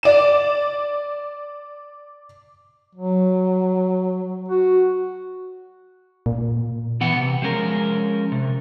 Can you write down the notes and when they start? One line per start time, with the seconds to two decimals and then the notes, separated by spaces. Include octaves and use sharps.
0.03 D5 E7
2.95 F#3
4.49 F#4
6.26 A#2
7.01 E3 B3 F#5
7.16 C3
7.42 F3 G#3 C#4 A#4
8.32 C3